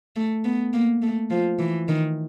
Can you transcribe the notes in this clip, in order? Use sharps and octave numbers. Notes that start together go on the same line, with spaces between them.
A3
B3
A#3
A3
F3
E3
D#3